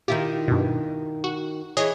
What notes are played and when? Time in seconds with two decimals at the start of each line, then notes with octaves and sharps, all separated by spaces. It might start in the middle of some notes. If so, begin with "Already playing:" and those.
0.08 D#3 E4 F4 G4
0.48 G2 B2
1.24 F#4
1.77 E3 G#4 C#5 D#5